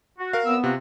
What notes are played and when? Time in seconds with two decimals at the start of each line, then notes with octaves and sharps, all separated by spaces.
0.19 F#4
0.33 A#4 F5
0.46 F#2 B3 C4 E6
0.64 C3 F4 F#4